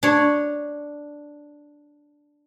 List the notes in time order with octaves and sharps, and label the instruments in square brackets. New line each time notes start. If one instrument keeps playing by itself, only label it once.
[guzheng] D4 C#5